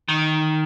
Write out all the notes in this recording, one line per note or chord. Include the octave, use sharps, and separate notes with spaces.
D#3